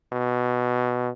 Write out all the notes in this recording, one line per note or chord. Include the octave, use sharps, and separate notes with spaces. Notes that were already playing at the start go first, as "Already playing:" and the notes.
B2